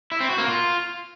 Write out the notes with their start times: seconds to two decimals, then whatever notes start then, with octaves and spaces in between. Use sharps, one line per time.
0.12 E4
0.20 C4
0.29 F#4
0.38 A#3
0.47 F4